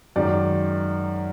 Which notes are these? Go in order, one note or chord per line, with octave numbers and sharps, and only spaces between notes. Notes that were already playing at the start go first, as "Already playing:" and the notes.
F#2 D#3 G#3 D5